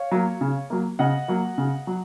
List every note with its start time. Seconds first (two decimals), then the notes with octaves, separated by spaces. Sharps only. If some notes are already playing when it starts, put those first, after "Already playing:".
Already playing: C#5 F5
0.12 F#3 A#3
0.41 C#3
0.70 F#3 A#3
0.99 C#3 D#5 F#5
1.28 F#3 A#3
1.58 C#3
1.87 F#3